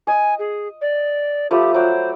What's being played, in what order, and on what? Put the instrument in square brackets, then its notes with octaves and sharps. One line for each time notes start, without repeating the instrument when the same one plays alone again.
[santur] D#5 [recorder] G#5
[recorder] G#4
D5
[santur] F3 A3 B5 [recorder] G4
[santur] F#3 D5 [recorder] C5